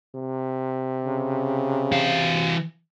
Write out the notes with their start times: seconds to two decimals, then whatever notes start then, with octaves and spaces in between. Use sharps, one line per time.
0.15 C3
1.05 C#3
1.92 E3 F5